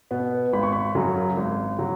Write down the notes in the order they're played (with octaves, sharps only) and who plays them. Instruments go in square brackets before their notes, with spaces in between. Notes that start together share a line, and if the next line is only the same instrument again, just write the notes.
[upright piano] B2 B3
G#1 B5
C#6
B5
F#2 C#3 F#3
G#1
C#3 F#3